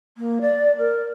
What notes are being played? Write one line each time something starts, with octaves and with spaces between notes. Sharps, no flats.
A#3
D5
A#4